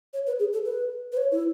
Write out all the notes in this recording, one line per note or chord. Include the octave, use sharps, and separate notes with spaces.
C#5
B4
G#4
A4
B4
B4
C#5
E4